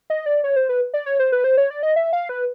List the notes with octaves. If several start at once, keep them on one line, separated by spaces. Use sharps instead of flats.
D#5
D5
C#5
C5
B4
D5
C#5
C5
B4
C5
C#5
D5
D#5
E5
F5
B4